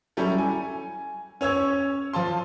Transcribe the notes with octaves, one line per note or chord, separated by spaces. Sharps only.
F#3 G3 C#4 E4 A4
G#5
C#4 C#5 E6 G#6
F3 F4 A5 C6